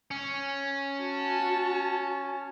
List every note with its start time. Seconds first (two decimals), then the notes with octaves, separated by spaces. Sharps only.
0.11 C#4
0.99 F#4 A5